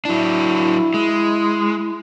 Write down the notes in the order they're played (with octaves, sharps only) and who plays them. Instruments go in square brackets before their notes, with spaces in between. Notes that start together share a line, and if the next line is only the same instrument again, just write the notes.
[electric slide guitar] F#3 D4 [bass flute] E4
[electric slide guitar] G#3